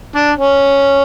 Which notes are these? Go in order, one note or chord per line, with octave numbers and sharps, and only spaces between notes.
D4
C#4